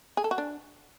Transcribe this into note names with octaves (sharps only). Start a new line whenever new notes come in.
G#4
A4
F#4
D4